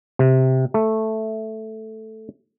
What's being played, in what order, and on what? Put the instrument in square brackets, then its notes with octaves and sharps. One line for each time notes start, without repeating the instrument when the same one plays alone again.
[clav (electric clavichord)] C3
A3